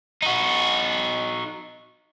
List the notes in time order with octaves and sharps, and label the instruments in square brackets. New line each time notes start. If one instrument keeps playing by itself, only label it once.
[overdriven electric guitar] D#4 F#4